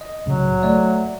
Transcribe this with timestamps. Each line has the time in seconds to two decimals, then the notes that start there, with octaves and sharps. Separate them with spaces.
0.01 D#5
0.26 C2 A2 C#3 F#3
0.62 A3 D5 E5